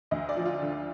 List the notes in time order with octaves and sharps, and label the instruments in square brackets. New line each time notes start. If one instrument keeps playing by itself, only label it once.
[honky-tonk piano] D2 D#5
D5
F3
F4
D3